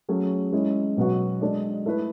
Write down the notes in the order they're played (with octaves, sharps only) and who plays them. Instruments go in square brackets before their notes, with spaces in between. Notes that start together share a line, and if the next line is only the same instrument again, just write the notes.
[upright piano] F#3 A3 C#4 G#4
G#3 C#4 E4 G#4
B2 F#3 B3 F#4
G#3 D4 A4 D5
A3 E4 B4